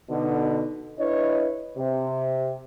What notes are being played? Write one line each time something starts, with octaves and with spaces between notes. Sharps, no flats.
B2 D3 D#4
D4 E4 B4 C#5 D#5
C3